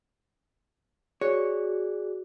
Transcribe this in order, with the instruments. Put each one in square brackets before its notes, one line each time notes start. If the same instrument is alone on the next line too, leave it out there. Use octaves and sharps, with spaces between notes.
[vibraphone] F#4 [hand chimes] G#4 D5 [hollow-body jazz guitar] C#5